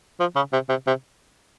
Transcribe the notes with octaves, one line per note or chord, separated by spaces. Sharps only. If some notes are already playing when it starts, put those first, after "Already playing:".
F3
C#3
C3
C3
C3